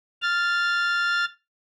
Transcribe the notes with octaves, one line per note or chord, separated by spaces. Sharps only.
F6 A6